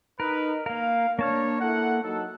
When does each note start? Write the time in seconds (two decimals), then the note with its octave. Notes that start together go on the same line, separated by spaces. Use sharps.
0.20 D#4 A#4 B4
0.66 A#3 A#4 F5
1.19 A#3 D4 C#5 A5 F6
1.61 E4 A4 F#5
2.04 F#3 D#4 A4